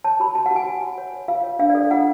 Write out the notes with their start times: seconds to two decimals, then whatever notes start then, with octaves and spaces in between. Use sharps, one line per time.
0.04 C#5 A5
0.20 F#4 B5
0.35 F#4 A5
0.46 F#5
0.51 F#4 G#5
0.67 C#5
0.83 F#4
0.98 C#5
1.14 C#5
1.28 F4 F5
1.44 C#5
1.59 D4 F5
1.70 D5
1.75 A4
1.81 D5
1.91 F4 F#5